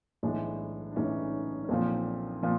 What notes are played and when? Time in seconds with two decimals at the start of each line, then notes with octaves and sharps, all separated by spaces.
0.23 B1 A2 E3 G#3 D4 E4
0.92 D4
0.96 B1 A2 E3 G#3 C#4 D#4
1.64 C#4
1.69 B1 A#2 F3 C4 D4
2.43 A#2 F3